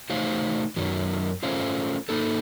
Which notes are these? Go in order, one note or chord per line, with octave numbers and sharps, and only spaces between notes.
A3 D#4 F#4 C5 F5
F#2 D#3 F#3
A3 C#4 F4 C5 F5
A#3 D#4 A4